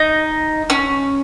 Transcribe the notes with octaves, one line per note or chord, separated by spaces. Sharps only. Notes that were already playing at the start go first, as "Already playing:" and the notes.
Already playing: D#4
C#4